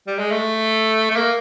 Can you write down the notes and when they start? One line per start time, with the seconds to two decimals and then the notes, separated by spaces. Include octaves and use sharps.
0.07 G3
0.19 G#3
0.31 A3
1.11 A3
1.16 A#3